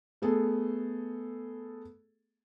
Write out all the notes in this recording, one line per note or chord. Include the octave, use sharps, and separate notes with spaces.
A3 B3 G#4 A4